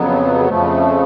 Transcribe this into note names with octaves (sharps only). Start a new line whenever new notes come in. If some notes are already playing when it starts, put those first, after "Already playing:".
Already playing: F2 C#3 F#3 B3
F2 C#3 F3 A3